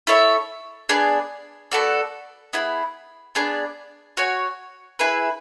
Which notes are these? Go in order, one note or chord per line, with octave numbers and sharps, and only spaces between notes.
E4 A4 C#5 E5
B3 D4 G#4 D5
B3 F#4 A4 D5
B3 E4 G#4
B3 D4 G#4 D5
F#4 C#5 G#5
E4 G#4 B4